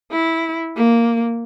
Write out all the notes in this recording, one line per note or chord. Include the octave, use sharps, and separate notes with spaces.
E4
A#3